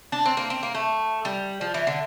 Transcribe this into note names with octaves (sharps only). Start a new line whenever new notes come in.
D4
C4
A#3
C4
A#3
A3
G3
F3
E3
D3